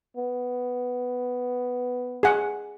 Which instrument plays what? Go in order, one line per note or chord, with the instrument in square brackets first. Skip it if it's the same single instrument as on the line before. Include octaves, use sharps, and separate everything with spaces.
[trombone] B3
[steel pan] G#4 F#5